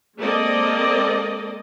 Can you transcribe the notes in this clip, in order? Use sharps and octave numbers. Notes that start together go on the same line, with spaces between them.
G#3 A#3 C4 A4 D5 D#5